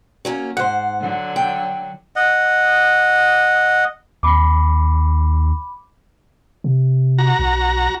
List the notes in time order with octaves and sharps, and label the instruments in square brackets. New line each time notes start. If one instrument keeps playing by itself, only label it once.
[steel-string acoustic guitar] F#3 A#3 C#4
[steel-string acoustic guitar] G#2 C5 [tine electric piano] F#5 C6
[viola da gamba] D3 F#3
[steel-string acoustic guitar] G5
[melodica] D#5 F#5
[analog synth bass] D#2 [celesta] B5 D6
[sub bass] C3
[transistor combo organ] F#4 A#5
[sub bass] B1